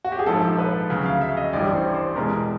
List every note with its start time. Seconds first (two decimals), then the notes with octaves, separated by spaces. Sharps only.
0.05 F#4
0.12 G4
0.19 G#4
0.26 A#1 G#2 F3 A4
0.58 B4
0.90 D2 C#3 F#3
1.06 F5
1.21 E5
1.37 D#5
1.53 A1 G2 E3 G3 D5
1.74 C5
1.95 C5
2.16 E2 B2 G#3 A#4